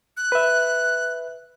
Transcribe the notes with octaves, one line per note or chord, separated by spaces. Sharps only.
F#6
B4 E5